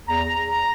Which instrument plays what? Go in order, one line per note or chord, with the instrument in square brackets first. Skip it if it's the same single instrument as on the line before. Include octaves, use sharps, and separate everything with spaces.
[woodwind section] E2 A#5